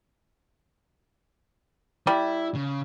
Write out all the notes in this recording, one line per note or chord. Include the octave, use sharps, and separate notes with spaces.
G3 E4
C#3